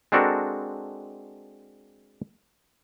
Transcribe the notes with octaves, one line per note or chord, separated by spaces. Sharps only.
G#3 C4 D4 F#4 A4 A#4